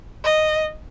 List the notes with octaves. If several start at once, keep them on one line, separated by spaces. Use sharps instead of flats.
D#5